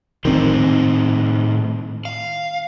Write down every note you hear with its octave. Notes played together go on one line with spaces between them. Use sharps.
A2 D#3 C4 D#4 C5
F5